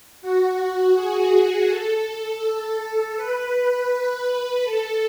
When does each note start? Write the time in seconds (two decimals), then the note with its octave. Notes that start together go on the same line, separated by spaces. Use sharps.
0.22 F#4
0.95 G#4
1.69 A4
3.17 B4
4.65 A4